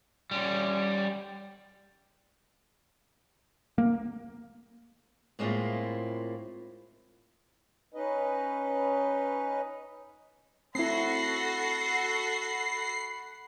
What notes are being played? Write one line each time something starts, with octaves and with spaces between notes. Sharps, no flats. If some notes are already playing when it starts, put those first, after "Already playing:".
G3 C#4
A#3
A2 G#3 A#3 C4 E4 F4
C#4 D#4 B4 D#5
C4 E4 F#4 A4 F#5 B5 A#6 C7